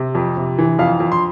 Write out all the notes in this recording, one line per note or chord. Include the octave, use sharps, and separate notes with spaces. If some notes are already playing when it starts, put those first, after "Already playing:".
Already playing: C3
F2
C3
E3
F2 F5
F2
C6